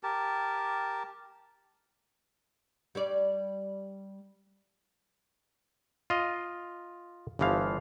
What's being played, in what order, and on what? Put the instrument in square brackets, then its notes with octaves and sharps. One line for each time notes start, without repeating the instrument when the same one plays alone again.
[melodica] G4 A#4 A5
[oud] G3 C#5 D5
[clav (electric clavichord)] F4 D#5
G1 G2 E3 F3 F5